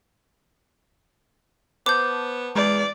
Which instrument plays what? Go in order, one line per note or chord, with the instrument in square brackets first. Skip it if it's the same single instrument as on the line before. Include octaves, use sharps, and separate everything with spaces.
[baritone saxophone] B3 [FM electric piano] C5 A5 [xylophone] D6 G6
[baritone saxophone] E2 [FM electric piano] G#3 [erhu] D5